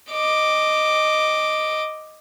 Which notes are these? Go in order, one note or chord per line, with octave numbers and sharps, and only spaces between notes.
D#5 D6